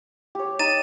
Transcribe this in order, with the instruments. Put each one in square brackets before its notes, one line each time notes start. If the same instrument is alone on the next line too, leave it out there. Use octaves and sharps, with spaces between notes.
[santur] G4 C#5
[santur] D#4 [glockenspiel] A6 D#7 E7